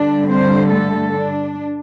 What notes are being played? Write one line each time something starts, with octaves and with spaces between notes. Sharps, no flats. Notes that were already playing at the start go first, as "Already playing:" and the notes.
Already playing: G2 D3 G3 D4
C4 C5
A3 A4
D4